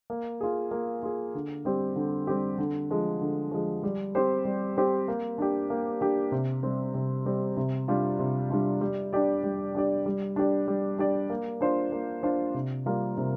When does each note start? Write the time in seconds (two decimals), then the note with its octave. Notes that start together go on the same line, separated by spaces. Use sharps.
0.10 A#3
0.41 F4 G#4
0.71 A#3
1.03 F4 G#4
1.35 D3
1.65 G3 C4 G4
1.96 D3
2.27 G3 C4 G4
2.58 D3
2.90 F3 G#3
3.21 D3
3.51 F3 G#3
3.83 G3
4.15 C4 G4 C5
4.45 G3
4.77 C4 G4 C5
5.08 A#3
5.38 D4 G4
5.70 A#3
6.01 D4 G4
6.32 C3
6.63 G3 C4
6.94 C3
7.26 G3 C4
7.57 C3
7.88 G3 D4 F4
8.19 C3
8.50 G3 D4 F4
8.81 G3
9.13 D4 G4 D5
9.43 G3
9.75 D4 G4 D5
10.06 G3
10.36 D4 G4 D5
10.68 G3
10.98 D4 G4 D5
11.30 A#3
11.61 D4 F4 C5
11.92 A#3
12.23 D4 F4 C5
12.54 C3
12.86 G3 A#3 F4 A#4
13.17 C3